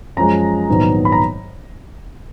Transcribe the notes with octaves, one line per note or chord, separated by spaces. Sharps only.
F#2 F3 G#3 A#5
A#1 G#2 D#3 F#3 B3
B5
A#5